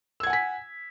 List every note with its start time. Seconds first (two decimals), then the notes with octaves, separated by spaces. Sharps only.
0.20 E6
0.23 G#6
0.27 F#5
0.30 G#5
0.33 B6